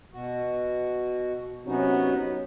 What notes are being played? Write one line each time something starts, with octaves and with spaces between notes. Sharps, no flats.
B2 F#4
C3 F#3 B3 C#4 D#4 F#4